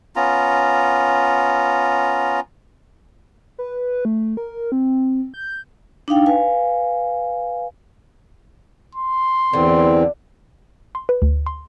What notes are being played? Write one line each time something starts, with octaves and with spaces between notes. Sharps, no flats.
B3 C#4 F4 A#5
B4
A3
A#4
C4
G6
D4 D#4 F5 G5
B4 F5 G#5
C6
E2 D3 E3 C4
C6
B4
D2
C6